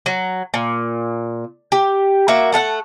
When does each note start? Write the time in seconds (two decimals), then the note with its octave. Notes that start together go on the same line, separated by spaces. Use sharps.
0.06 F#3
0.54 A#2
1.72 G4
2.28 A#3 F#4 E5
2.52 A3 A4 F5 F#5